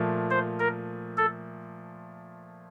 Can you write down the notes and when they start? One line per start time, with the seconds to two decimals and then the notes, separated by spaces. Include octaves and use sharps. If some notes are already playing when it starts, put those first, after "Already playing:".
Already playing: A#2 F3 A3
0.30 C5
0.60 A#4
1.17 A4